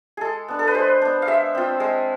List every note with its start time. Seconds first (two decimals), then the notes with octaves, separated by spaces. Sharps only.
0.17 G#3 G#4 A4
0.48 B3 D4
0.59 A4
0.67 B4
0.75 G#3 C5
1.02 B3 D4
1.22 F5
1.27 G#3 E5
1.55 C4 F4
1.80 G#3